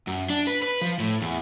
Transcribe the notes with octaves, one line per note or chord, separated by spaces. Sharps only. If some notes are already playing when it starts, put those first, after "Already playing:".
F#2
D4
B4
B4
F3
A2
E2